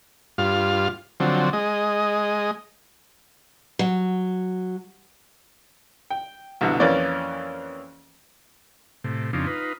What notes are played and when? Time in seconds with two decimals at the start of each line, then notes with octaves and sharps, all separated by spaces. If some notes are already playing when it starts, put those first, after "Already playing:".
0.38 G2 F4 F5
1.20 D3 F3 F#3 C4
1.53 G#3 D#5
3.79 F#3
6.10 G5
6.61 C2 B2 D3
6.80 F2 E3 A#3 C#4 D5
9.04 A2 C3
9.33 F2 C#3 F3 C4 D4 D#4
9.47 D#4 F4 B4